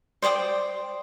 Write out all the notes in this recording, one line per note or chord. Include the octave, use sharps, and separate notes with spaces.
C5 D5 G5 D#6